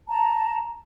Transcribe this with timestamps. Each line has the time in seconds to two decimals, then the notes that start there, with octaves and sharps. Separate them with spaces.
0.08 A5 A#5